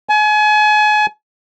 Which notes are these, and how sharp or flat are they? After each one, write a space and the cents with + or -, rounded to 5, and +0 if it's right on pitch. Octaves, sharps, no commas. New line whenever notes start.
G#5 +35